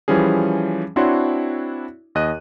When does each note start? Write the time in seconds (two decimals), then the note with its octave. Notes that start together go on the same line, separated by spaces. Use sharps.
0.08 E3 F3 G3 C#4 G#4
0.96 C4 D4 E4 F#4 C#5 C6
2.15 D#2 D#5 F#6 D#7